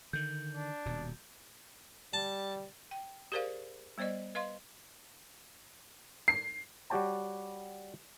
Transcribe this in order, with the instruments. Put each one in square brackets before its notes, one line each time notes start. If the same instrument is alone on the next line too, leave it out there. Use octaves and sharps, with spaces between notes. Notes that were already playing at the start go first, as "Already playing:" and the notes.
[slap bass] D3 D#3 [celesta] G6
[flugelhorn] D4
[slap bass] D#1 B2
[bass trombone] G3 [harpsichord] A5
[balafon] G5
G4 G#4 A#4 C5 D5 F5
G3 B3 C5 D5 D#5
B4 D#5 F5 C6
[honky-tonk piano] C7
[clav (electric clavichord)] G3 F#4 G4 C#5 G5 A5